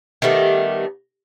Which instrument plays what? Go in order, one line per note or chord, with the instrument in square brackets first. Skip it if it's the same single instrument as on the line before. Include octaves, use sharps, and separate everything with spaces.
[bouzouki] D#3 G3 A3 B3